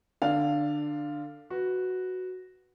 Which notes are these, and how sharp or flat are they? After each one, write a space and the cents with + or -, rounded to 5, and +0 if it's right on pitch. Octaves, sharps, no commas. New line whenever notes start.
D3 +15 D5 +0 F5 +0
F#4 +0 B4 +0